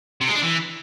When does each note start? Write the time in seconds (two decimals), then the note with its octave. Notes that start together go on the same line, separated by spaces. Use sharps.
0.21 C3
0.28 G#3
0.35 D4
0.42 E3